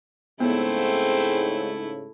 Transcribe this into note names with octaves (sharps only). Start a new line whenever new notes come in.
G#2 C#3 A3 B3 C4 E4